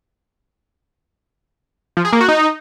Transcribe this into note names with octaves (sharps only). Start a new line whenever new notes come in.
F3
G#4
A#3
F#4
D#4